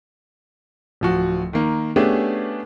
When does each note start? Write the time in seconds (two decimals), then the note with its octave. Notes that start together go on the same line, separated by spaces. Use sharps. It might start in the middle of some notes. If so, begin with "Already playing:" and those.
1.01 D1 F3 F#4
1.53 D#3 A#3
1.96 A3 B3 C#4 D4 G4 G#4